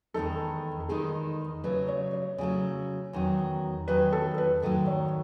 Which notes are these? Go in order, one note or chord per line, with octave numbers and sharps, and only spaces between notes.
E2 D#3 G#3 D#4 A4
A4
E2 D#3 G#3 D#4 G#4
C#3 F#3 A3 B4
C#5
C#5
C#3 F#3 A3
E2 D#3 F#3
E2 D#3 F#3 B4
A4
B4
G#2 D#3 F#3 A3 A4
C#5